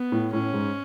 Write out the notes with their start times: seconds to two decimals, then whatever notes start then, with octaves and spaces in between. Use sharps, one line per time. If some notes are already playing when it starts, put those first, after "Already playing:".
Already playing: B3
0.12 A2
0.33 A2 C#4
0.53 G#2